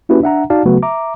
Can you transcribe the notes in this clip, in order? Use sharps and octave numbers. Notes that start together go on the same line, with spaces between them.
A#3 C#4 E4 F#4 G4 B4
D4 E5 F#5 A#5
D#4 F#4 D5 F5 A5
C#3 F#3 A3 B3 F#4 B4
E5 A#5 D6